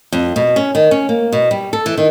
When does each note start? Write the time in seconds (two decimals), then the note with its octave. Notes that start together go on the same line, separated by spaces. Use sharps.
0.12 F2
0.36 B2
0.56 C#4
0.75 D#3
0.91 C#4
1.09 A#3
1.33 B2
1.51 G3
1.73 A4
1.86 E3
1.97 D#3